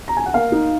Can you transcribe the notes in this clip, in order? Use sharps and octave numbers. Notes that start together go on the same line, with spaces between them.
A#5
G#5
F#5
A#3 F5
D#4